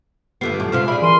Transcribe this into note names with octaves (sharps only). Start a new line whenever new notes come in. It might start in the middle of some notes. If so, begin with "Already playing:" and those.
G2 D3 B3 F4 G4 C7
F#2 A2
G#2 C3 C#4 F4 F6
E4 F4 G#4 D5 B5
E3 A#4 C6 D#7